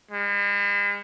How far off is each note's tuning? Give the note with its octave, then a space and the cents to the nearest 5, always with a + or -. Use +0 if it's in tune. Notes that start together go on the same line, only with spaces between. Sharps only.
G#3 -45